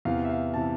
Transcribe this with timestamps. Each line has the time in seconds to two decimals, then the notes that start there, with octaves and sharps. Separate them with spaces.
0.05 E2 C3 E3 F5
0.25 E5
0.30 F5
0.54 C3 E3 A5